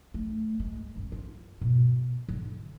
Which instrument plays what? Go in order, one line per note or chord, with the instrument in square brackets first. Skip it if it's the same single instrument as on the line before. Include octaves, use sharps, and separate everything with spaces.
[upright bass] A3
G#3
F#2
F4
B2
D3